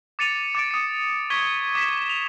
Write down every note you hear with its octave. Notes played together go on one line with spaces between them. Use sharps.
D6 A6 C#7 D#7 F7
D6 A6 D7
D#6 C#7
C#6 G#6 B6 G7
D6 B6 E7
F7